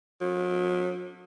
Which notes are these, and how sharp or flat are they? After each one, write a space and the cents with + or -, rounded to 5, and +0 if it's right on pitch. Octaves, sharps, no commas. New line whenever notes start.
F#3 -45